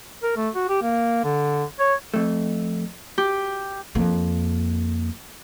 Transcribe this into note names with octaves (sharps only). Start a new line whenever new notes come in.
A#4
A3
F#4
G4
A#3
D3
C#5
F2 A3
G4
F2 A#3